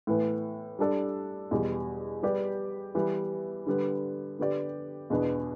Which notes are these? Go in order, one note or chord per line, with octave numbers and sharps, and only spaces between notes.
A2 E3 B3
G3 D4 A4 D5
E2 B2 G3
G3 B3 G4 D5
E3 G3 B3
D3 G3 B3
D3 B3 G4 D5
E2 B2 B3 D4 B4